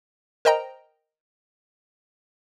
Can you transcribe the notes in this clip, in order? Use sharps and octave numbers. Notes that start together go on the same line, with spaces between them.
A#4 C5 D#5 G5 A#5